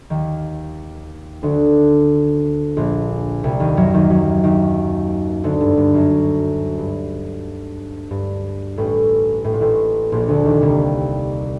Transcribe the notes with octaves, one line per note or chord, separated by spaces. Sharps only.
D#2 D#3
D2 D3
A#1 A#2
C2 C3
D#2 D#3
F#2 F#3
D#2 D#3
F#2 F#3
D#2 D#3
D2 D3
G2
G2
F#2
G2
G2
A1 A2
A2
A#2
A1 A2
A#1 A#2
D2 D3
D#2 D#3
C2 C3